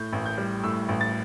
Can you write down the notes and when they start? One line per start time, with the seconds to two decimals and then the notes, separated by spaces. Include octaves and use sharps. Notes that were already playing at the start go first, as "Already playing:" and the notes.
Already playing: A2 G6
0.13 A1
0.26 G6
0.38 G3
0.63 A2 E6
0.89 A1
1.01 A6